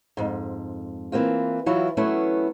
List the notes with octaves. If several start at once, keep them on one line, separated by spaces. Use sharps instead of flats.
F2 G#2
E3 A#3 C4 F4
E3 F#3 E4 F4
F#3 A3 B3 C#4 E4